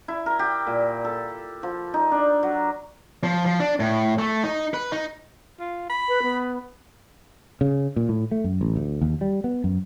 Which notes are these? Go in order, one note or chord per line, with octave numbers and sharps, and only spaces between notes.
E4
A#4
G4
A#2
A4
F3
D#4
D4
F#3
F3
F3
D4
A2
A3
D#4
B4
D#4
F4
B5
B4
B3
C#3
A#2
A2
A3
F#2
A1
D2
D#2
G3
B3
F#2